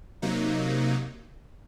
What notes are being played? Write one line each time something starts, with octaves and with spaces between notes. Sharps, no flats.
C3 F#3 A#3 D#4